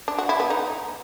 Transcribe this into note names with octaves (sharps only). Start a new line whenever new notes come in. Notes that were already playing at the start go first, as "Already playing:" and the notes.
D4
F#4
E4
B3
D#4